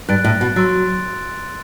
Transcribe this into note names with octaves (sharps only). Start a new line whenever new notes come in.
G2 F#6 A6 D7
A2
B2
F#3 C6 E6 A6 D7